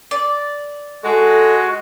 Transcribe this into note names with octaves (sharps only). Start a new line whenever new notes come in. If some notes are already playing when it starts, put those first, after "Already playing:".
D5
G#3 F#4 A4